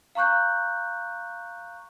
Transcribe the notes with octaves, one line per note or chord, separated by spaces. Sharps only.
F5 A#5 C#6 F#6 G6